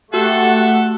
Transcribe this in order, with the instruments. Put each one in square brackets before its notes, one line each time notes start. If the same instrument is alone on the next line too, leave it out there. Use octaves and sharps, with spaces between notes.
[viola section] A3 G4 F#5 [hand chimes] F#4 [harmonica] A4 E5